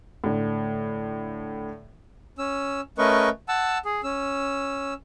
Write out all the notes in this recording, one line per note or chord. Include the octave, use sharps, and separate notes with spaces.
A2 D3
C#4 E6
A3 C#4 A#4 B4 D#5 C#6
F#5 A5 E6
G#4
C#4 E6